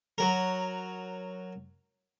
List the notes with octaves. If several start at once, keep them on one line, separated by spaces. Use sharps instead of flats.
F#3 A#4